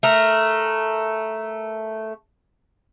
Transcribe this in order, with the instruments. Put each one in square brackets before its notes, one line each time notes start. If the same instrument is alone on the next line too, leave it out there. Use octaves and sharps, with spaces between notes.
[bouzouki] A3 A#4